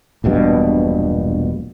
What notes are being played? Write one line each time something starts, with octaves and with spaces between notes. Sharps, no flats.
E1 A#1 G2 B2